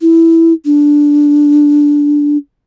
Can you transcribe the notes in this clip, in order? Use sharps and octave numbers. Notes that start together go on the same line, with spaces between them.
E4
D4